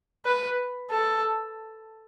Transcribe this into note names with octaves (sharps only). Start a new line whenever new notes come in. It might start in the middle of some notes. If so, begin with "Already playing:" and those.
B4
A4